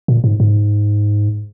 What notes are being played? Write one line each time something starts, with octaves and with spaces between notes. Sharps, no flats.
A#2
G#2
G#2